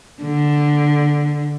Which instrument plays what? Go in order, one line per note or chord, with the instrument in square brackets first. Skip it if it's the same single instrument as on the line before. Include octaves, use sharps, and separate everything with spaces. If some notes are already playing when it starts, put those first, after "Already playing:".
[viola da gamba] D3